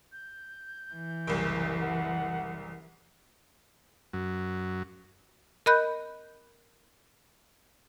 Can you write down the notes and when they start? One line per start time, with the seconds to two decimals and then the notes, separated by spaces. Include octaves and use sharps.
0.12 G6
0.93 E3
1.27 F#1 C2
1.80 F#5
4.13 F#2
5.66 A#4 D#5 B5 F#6 G6